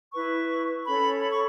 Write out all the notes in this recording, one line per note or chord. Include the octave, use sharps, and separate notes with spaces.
E4 B4 C#6
C#4 A4 C#5 B5
B5
C#6